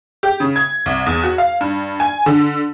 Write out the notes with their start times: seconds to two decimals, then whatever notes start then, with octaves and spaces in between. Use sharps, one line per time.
0.23 G4
0.40 C#3
0.56 G#6
0.86 C2
1.06 E2
1.23 F#4
1.38 F5
1.61 G2
2.00 G#5
2.26 D3